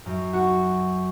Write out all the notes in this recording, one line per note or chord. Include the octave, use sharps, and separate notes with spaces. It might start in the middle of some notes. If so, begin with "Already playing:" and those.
F#2
F#4